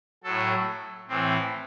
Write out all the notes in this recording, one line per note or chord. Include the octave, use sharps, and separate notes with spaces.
A2 F#3 A4
A2 E3 C4